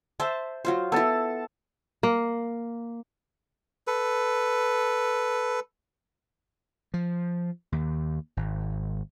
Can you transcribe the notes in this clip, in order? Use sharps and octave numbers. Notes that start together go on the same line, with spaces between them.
C5 E5 A5
F#3 F4 C5
B3 E4 A4 A5
A#3
A4 B4
F3
D#2
G#1